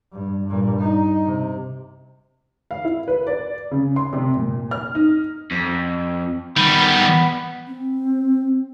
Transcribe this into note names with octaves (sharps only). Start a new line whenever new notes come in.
G2
G2 A#2
D#4
C3
F5
E4
B4
D5
C#3
C6
C3
A#2
F6
D#4
F2
D#3 G3 B3
C4